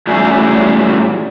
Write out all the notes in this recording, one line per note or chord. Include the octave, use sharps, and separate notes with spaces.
A2 E3 F#3 G3 C#4 G#4